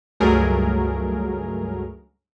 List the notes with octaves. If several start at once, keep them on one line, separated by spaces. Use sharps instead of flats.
C#2 G2 F#3 A3 G#4 A#4